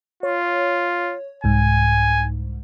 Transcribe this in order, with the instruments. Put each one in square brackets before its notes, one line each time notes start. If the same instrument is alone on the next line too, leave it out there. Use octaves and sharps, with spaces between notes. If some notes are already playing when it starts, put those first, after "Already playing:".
[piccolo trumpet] F4 [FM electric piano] C#5
[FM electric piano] C2 G#2 [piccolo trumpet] G#5